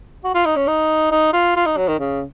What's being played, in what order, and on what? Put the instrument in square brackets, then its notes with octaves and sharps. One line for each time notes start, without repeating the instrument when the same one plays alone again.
[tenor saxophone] F#4
F4
D#4
C#4
D#4
D#4
F4
F4
D#4
F#3
D#3
C#3